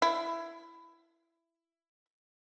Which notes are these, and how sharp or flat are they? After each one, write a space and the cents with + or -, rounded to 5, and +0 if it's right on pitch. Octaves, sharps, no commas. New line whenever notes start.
E4 +15